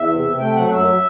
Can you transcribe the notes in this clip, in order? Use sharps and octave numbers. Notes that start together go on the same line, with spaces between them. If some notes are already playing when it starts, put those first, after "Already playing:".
Already playing: E2 E5
C3
C3
A3 G5
F#3 F#5
F#2 E5